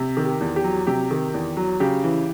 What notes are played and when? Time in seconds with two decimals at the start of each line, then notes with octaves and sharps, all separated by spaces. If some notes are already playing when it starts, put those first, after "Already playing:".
Already playing: C3
0.17 D#3
0.25 G4
0.41 E2
0.56 G4
0.64 F#3
0.87 C3 G4
1.11 D#3
1.34 E2
1.57 F#3
1.80 C#3 G4
2.04 E3